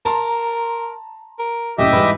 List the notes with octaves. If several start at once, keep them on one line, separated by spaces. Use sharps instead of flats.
A#4 A5 A#5 C6
A#4
F#1 A2 C#3 G4 D#5 E5
G#2 E3 G3 B4